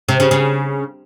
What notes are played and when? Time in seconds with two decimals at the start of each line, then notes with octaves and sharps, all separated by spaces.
0.08 C3
0.20 C#3
0.31 C#3